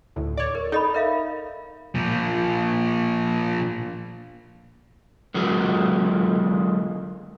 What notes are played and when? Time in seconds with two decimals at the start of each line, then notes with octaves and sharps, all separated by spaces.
0.16 D2 A2
0.37 C#5 D5
0.55 A#4
0.72 D#4 A4 D#5 B5
0.94 A#4 E5 F5
1.95 A#2 F3
5.34 D3 F#3 G#3 A#3 F4 F#4